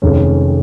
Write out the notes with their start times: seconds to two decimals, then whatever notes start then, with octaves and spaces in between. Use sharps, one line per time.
0.02 F1 F2 D#3 G#3 C#4